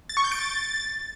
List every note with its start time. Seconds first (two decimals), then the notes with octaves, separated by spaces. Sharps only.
0.09 A6
0.17 C#6
0.24 G6
0.32 D7
0.39 A6